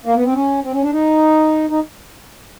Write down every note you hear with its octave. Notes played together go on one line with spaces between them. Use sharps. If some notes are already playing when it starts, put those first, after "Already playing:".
A#3
B3
C4
C#4
C4
C#4
D4
D#4
D#4